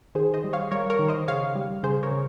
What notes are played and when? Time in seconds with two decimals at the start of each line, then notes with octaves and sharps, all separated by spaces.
0.15 D#3 G#4 C5
0.34 C5 D#5
0.44 G3
0.53 C#5 F5
0.71 G3 A#4 C#5
0.90 A#4 C#5
0.99 D#3
1.08 C5 D#5
1.28 C#3 C#5 F5
1.56 G3
1.83 C#3 G#4 C5
2.03 A#4 C#5
2.11 C#3